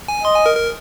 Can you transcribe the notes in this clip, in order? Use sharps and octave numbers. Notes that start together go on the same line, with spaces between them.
G#5
D#5 C6
G#5
A#4
A#4